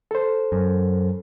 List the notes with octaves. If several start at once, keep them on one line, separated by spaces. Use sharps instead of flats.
A4 C5
F#2